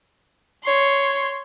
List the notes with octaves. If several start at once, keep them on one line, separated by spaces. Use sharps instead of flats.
C#5 C6